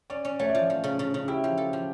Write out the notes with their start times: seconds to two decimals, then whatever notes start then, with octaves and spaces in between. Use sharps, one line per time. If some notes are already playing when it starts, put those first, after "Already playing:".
0.10 C#4 D5
0.25 C#4
0.39 A3 C#5
0.49 D5
0.55 F3
0.70 F3
0.84 C#3
0.99 C#3
1.14 C#3
1.28 E4 G4
1.44 F3
1.57 A4
1.73 F3